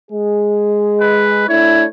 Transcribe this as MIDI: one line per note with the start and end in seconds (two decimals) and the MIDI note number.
0.12 1.46 56
0.12 1.46 68
1.01 1.47 71
1.48 1.86 57
1.48 1.86 62
1.48 1.86 64
1.48 1.85 73